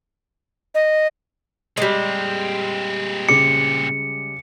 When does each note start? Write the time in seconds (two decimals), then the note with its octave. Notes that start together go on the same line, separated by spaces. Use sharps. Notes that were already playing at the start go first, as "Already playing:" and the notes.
0.75 D#5
1.77 A#2 G3 G#3 C4
3.29 C#3 G#4 D6 C#7